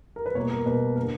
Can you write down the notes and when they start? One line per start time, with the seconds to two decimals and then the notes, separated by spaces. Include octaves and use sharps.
0.16 A#4
0.26 B4
0.35 B2 G3 A#3 C#5
0.51 A#4
0.66 B2 G3 A#3 B4
0.96 D3 A#3 A#4